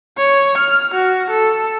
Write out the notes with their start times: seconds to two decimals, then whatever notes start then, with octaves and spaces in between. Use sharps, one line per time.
0.17 C#5
0.58 F6
0.94 F#4
1.30 A4